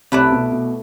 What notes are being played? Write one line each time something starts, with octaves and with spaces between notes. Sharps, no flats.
C2 C3 A3 E4 B4 D5
B2
B2